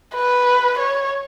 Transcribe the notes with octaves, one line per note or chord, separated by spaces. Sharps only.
B4
C#5